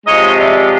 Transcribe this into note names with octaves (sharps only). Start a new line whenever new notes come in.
C3 F3 G#3 C#5 D#5
D5 E5